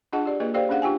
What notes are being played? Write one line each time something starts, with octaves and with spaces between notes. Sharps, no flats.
D4 F4 G#4 D#5 F#5 A5
G4 D5
A#3 F4 G#4 B4 D#5
G4 A4 C5 D5 F5 G5
C#4 D4 G#4 F5 F#5
D4 F4 G4 G5 G#5